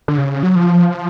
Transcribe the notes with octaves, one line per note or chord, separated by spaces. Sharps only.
D3
C#3
F#3
F3